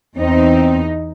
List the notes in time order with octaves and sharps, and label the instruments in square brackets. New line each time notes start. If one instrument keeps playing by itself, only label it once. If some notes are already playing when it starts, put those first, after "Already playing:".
[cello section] E2 D#4 [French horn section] C4